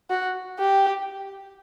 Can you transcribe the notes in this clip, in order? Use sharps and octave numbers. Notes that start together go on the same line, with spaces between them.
F#4
G4